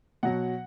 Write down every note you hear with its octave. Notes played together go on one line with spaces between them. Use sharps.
B2 F#3 F#5